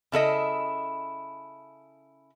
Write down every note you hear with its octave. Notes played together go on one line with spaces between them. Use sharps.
C#3 E4 A4 D#5